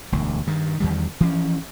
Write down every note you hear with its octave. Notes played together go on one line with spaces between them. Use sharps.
E1 D2
G2 D#3
E2 D#3 G3
E3 F3 C4 C#4